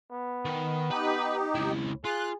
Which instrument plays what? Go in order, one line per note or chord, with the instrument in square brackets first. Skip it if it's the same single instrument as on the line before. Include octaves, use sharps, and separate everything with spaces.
[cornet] B3
[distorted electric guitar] D#3
[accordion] D#4 G4 [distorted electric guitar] B4 B5
[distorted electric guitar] C#2 E4
[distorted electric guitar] F4 [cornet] G#4 [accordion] F#6